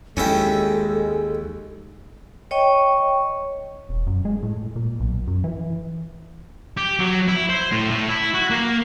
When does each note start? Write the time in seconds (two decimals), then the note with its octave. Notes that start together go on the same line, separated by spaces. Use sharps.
0.17 D#2 G#3 C#4 E4 A4 G5
2.51 C#5 D#5 G5 C#6
3.89 E1
4.07 F#2
4.25 G#3
4.43 A2
4.76 A#2
5.00 B1
5.27 F#2
5.44 E3
6.77 G4
6.99 F#3
7.28 E4
7.50 C5
7.72 A2
7.91 A2
8.09 E4
8.34 F#4
8.50 A#3